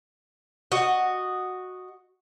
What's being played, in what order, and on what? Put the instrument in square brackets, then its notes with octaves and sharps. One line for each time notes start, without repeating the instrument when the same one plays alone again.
[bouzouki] F#4 D#5